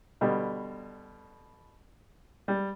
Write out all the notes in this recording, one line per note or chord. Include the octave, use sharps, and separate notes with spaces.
B2 D3 G3
G3